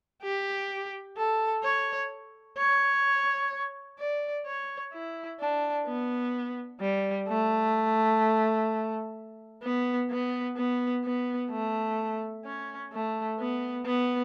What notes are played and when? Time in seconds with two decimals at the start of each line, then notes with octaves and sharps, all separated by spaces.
0.23 G4
1.17 A4
1.64 C#5
2.58 C#5
3.99 D5
4.46 C#5
4.93 E4
5.40 D4
5.87 B3
6.81 G3
7.28 A3
9.63 B3
10.10 B3
10.57 B3
11.05 B3
11.51 A3
12.45 C#4
12.93 A3
13.39 B3
13.86 B3